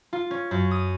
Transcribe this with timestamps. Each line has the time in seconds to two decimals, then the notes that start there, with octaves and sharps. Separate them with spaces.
0.13 F4
0.31 C#4
0.51 F#2
0.71 D#6